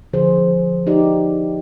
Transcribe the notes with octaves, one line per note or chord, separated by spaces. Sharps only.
D3 F3 G#4 C5
D#4 G4 D5